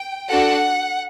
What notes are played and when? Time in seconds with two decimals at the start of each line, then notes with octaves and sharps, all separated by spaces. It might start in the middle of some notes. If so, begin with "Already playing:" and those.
Already playing: G5
0.29 D4 F#4 A4 F#5